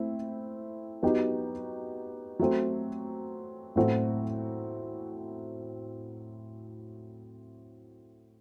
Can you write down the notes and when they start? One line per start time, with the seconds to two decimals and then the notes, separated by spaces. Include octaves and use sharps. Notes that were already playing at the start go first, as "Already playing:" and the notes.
Already playing: A3 C4 E4
1.03 F#3 B3 D#4 G4
2.39 F#3 A3 C4
3.76 A2 F#3 A3 C4 F#4